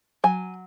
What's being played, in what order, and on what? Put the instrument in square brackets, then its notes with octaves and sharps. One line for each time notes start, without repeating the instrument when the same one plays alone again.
[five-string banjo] F#3 G#5